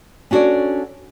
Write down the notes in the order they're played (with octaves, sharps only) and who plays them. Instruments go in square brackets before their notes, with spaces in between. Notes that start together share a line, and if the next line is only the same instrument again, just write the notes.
[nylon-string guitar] C#4 D4 F#4 A4 C#5 D5